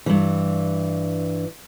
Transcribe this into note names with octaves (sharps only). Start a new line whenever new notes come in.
G2 E3